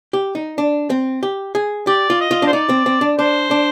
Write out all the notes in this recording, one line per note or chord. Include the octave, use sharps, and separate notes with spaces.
G4
D#4
D4
C4
G4
G#4
G4 D5
F4
D#5
F4
D4 C5
D#4 D5
C4
C4
D4
D4 C5
D4